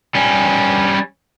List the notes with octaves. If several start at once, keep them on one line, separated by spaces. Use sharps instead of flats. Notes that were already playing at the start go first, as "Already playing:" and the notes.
G3 C#4